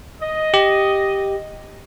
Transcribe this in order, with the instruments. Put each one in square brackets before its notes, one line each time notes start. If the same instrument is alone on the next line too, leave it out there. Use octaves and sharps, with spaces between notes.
[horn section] D#5
[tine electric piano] G4